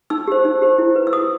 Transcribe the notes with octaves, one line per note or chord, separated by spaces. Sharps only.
D#4 E6
G4 C5
D#4
G4 C5
E4
B4
E6
E4 D#6